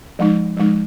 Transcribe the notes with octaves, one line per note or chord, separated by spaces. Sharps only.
F3 G#3 D#4
F3 G#3 D#4